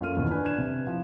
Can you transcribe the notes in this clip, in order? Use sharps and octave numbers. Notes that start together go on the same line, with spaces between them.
F#2 A#3 F4 A4 F6 D#7
D#2 B2 E3
D4 B4 G#5
D4 F#6 G#6 E7
C3
F3 E4